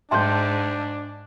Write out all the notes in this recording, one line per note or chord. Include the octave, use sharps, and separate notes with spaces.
G#2 D4 E5 G5 A5 C6 G6